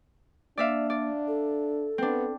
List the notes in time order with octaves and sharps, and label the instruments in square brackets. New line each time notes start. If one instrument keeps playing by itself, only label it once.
[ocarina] A#3 [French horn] D4 [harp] D5 E5 F5
[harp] D5
[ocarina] A4
[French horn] B3 [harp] C4 D4